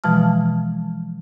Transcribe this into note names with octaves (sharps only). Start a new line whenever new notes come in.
B2 E3 F3 G#3 A5 F6